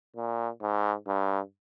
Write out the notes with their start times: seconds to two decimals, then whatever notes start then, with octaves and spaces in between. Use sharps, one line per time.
0.17 A#2
0.62 G#2
1.08 G2